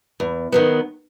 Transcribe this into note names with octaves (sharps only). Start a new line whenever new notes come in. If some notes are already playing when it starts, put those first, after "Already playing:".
E2
D#3 F#3 B3